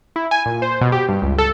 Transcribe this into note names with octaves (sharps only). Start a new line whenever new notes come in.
E4
G#5
A#2
C5
B2
G4
G2
C#2
A4